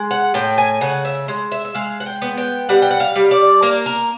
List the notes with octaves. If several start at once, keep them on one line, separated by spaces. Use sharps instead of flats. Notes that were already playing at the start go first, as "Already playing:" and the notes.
Already playing: G#3
F#5
A2 G5
G#5
C#3 F#5
E5
G#3
E5
E5
G#3 F5
F#5
G5
B3
G5
G3 F#5
G5
F#5
F5
G3
D5
A#3 A#4
A#4